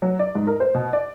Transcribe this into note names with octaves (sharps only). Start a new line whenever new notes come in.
F#3
D5
G#2
A#4
C5
B2
D5